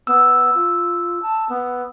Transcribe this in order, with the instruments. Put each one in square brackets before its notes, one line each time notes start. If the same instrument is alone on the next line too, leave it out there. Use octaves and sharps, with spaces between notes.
[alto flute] B3 [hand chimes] E6
[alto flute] F4
A5
B3